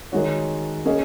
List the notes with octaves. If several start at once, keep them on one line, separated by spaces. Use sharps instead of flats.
D#3 G#3 D#4 F#4 C#5
A#3 C#4 G#4 D#5